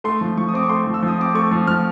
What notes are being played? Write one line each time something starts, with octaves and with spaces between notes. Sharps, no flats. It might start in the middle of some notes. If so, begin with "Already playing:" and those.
A3 C6
F3
F3 C#6
D#6
C4 D6
C#6
A3 C6
F3
E6
F3 D#6
C4 D6
A3 C#6
F3
F3 F6